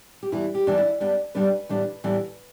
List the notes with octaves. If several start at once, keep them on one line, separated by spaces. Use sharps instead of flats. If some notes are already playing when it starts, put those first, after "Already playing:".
G4
G2 E3 B3 E4
G4
G2 E3 B3 D4
E4
G2 G3 B3 D4
G2 G3 B3 D4 B4
A2 E3 G3 B3 D4
A2 E3 G3 B3 D4